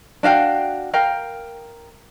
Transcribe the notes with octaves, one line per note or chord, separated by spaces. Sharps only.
D4 F#4 F5 G5
A#4 F5 G5